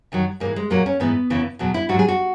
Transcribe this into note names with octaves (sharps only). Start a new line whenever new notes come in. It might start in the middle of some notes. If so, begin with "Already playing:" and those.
F#2 D#3 F#3
G#2 E3 A#3
G#3
A#2 F#3 A#3
C#4
G#2 E3 B3
E2 C#3 E3
E2 B2 F#3
E4
G#2 F#4
F#3
G#4
F#4